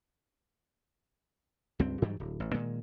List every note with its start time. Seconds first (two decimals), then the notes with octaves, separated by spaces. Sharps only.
1.79 C#2 G2 C4
2.02 G2 E3 F#3 G3
2.20 D1
2.40 A1
2.54 A#2 D#3 G#3